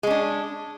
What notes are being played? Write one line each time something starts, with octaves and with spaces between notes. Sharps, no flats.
G#3 C#4 D4